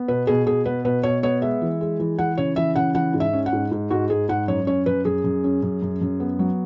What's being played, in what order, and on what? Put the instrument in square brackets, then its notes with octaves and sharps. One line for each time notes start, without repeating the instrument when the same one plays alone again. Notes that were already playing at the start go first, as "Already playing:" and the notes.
Already playing: [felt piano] B3
B2 B4
B2 G#4
B2 G#4
B3 B4
B2 B4
B2 C#5
B3 C#5
G#3 E5
E3
G#3
E3
E3 F#5
C#3 C#5
E3 E5
C#3 F#5
E3 F#5
G#2
E5
C#4
F#5
G#2
G#2
G#2 F#4
G#2 G#4
G#2 F#5
F#2 C#5
C#4 C#5
F#2 B4
F#2 G#4
F#2
C#4
F#2
F#2
F#2
B3
F#3